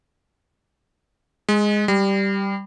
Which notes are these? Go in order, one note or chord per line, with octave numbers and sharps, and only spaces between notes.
G#3
G3